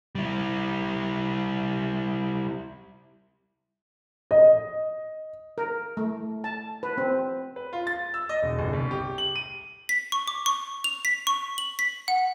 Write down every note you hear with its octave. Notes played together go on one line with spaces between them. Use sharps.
G3 E4
D#5
A#4
A3
A5
B4
C4
B4
F4
A6
E6
D#5
E1
G1
C2
G4
F#7
D#7
B6
C#6
D6
C#6
F7
B6
C#6
F#7
B6
F#5